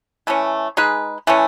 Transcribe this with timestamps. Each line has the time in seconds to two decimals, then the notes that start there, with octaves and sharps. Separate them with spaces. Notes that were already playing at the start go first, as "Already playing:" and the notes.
0.27 E3 A3 C#4
0.77 G#3 D#4 G#4 B4
1.27 E3 A3 C#4